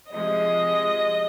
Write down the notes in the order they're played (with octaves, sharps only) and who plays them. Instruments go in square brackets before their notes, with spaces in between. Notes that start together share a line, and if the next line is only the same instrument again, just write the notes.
[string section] C3 F3 G#3 [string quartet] D#5